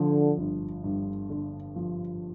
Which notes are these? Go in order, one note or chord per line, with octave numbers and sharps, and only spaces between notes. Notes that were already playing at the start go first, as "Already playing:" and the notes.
Already playing: D3 F3
G1
G2
D3
F3